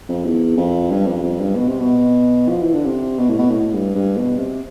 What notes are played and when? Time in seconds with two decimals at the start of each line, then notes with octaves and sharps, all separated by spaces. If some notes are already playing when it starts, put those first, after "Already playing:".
0.09 F2
0.25 E2
0.57 F2
0.91 G2
1.06 F2
1.23 F2
1.39 G2
1.56 B2
1.68 C3
1.80 B2
2.49 F3
2.61 E3
2.74 D3
2.86 C3
3.18 B2
3.29 A2
3.38 B2
3.51 A2
3.73 G2
3.95 G2
4.17 B2
4.38 C3